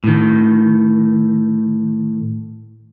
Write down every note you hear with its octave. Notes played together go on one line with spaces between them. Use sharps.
A2 D#3